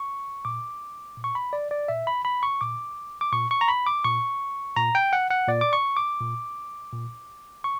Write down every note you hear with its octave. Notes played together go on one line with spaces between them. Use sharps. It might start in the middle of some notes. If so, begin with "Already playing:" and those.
Already playing: C#6
A#2 D6
A#2
C#6
B5
D5
D5
A#2 E5
B5
B5
C#6
A#2 D6
D6
A#2 C#6
C#6
A#5
B5
D6
A#2 C#6
A#2 A#5
G5
F#5
F#5
A#2 D5
D6
C#6
D6
A#2
A#2
C#6